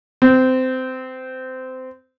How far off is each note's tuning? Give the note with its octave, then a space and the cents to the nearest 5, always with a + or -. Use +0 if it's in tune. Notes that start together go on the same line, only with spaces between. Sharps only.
C4 -20